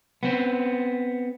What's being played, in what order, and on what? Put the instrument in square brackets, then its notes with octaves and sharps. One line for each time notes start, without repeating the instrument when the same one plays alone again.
[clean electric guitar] B3 C4